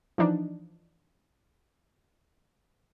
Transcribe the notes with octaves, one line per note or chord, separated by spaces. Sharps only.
E3 F3 D4 D#4